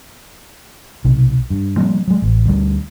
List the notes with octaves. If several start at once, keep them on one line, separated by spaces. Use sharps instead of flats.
B1 C3
G2
F3 G3 A#3 C4
F#3 G#3
A1
D2 G3